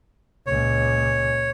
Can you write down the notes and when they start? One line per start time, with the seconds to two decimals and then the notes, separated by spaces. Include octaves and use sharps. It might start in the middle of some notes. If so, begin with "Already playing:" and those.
0.47 C#2 A#2 C#5